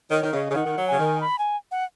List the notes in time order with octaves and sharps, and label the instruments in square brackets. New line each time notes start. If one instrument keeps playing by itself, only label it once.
[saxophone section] D#3 [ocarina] C#5
[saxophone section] D#3
[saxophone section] C#3 [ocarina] D#5
[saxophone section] C#3
[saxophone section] D#3 [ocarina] F#5
[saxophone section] D#3
F#3
[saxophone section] C#3 [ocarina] G#5
[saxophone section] D#3
[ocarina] B5
G#5
F#5